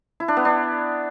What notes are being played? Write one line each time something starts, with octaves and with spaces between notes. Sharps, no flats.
E4
D4
B3
D4